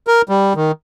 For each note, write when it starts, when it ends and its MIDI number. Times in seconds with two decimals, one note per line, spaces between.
0.07 0.22 70
0.29 0.53 55
0.56 0.72 51